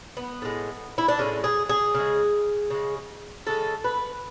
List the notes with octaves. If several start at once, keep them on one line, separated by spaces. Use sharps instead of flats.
B3
A2 G#3
E4
D4
A2 G#3 C#4
G#4
G#4
C#3 G#3
C#3 G#3
C#3 G#3 A4
B4